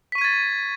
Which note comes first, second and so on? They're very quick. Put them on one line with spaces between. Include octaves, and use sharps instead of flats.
B6 C#6 D#7 G#6 A6